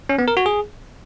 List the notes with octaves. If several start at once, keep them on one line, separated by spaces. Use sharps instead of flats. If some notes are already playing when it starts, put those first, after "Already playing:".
C#4
B3
A#4
F#4
G#4